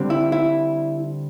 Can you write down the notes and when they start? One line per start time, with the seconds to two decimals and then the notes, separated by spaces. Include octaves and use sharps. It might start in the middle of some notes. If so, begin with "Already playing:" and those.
Already playing: D3 G3 C4
0.10 E4
0.32 E4